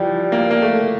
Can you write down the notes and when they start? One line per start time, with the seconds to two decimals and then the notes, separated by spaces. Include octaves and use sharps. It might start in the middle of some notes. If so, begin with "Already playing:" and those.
Already playing: E3 F3 G3
0.32 A#3
0.51 A#3
0.62 A3